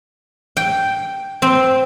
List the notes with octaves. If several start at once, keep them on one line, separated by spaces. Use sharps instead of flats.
G5
C4